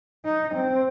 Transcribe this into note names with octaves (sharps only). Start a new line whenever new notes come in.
D#4
C4